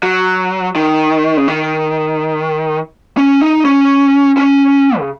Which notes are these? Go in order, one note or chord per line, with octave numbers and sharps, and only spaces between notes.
F#3
D#3
C#3
D#3
C#4
D#4
C#4
C#4
C#3